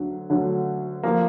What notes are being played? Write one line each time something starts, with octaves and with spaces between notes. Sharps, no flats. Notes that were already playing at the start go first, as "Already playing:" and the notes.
Already playing: D2 D3 F#3
D2 D3 F#3
F3 A#3